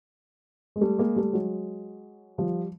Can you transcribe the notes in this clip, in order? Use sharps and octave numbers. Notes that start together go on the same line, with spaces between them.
G#3
G3 A3
G#3 A#3
G3 A3
F#3 G#3
F3 G3